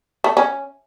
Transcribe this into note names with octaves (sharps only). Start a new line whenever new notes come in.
A3
C#4